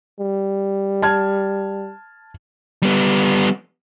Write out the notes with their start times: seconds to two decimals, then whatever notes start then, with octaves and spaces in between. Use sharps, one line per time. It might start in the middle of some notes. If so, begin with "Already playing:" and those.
0.20 G3
1.02 A5 F6 G#6
2.83 G3 B3